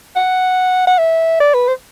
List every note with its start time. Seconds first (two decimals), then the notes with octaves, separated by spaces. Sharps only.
0.16 F#5
0.87 F#5
0.98 E5
1.40 D5
1.54 B4
1.68 C5